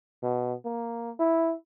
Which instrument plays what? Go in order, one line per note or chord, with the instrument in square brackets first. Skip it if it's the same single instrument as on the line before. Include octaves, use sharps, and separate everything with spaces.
[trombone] B2
A#3
E4